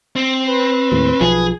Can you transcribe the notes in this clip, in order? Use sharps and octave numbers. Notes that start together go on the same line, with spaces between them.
C4
B4
D#2 A2
B1 F3 G#4